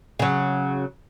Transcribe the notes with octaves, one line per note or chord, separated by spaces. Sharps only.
C#3 F#3